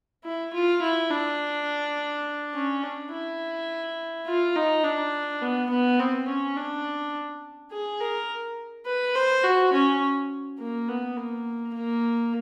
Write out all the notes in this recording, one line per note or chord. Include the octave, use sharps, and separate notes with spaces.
E4
F4
E4
D4
C#4
D4
E4
F4
D#4
D4
B3
B3
C4
C#4
D4
G#4
A#4
B4
C5
F#4
C#4
A#3
B3
A#3
A#3